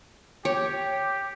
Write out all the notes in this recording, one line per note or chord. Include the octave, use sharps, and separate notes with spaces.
G4 C#5